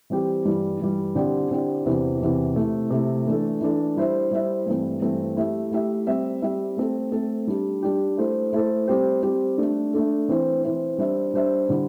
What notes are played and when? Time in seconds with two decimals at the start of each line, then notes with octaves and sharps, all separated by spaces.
0.10 E3 G3 C4 G4
0.45 G2 E3 G3
0.80 G2 E3 G3
1.15 D3 C4 E4 G4 D5
1.51 D3 C4 E4 G4 D5
1.85 E2 C3 E3 C4
2.21 E2 C3 E3 C4
2.56 C3 A3 E4
2.90 C3 A3 E4
3.26 E3 A3 D4 A4
3.61 E3 A3 D4 A4
3.97 G3 E4 C5 E5
4.31 G3 E4 C5 E5
4.67 G2 E3 A3 C4
5.02 G2 E3 A3 C4
5.37 A3 E4 G4 E5
5.71 A3 E4 G4 E5
6.07 G3 C4 G4 E5
6.42 G3 C4 G4 E5
6.77 A3 C4 A4
7.12 A3 C4 A4
7.47 G3 D4 G4
7.83 G3 D4 G4
8.17 A3 E4 A4 C5
8.53 A3 E4 A4 C5
8.87 G3 C4 G4 C5
9.23 G3 C4 G4 C5
9.58 A3 D4 A4
9.93 A3 D4 A4
10.28 E3 C4 E4 C5
10.64 E3 C4 E4 C5
10.98 G3 D4 C5 E5
11.34 G3 D4 C5 E5
11.69 D3 G3 E4